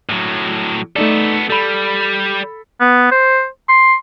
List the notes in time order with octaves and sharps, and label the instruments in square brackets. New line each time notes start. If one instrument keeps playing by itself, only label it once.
[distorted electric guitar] A2 F#3
[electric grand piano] A3 D#4 D5 [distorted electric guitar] B3 A4
[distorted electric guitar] G3 [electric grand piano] A4 B5
[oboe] B3
C5
C6